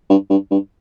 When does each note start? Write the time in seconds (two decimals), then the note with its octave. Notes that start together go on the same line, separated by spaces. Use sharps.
0.10 G2
0.30 G2
0.51 G2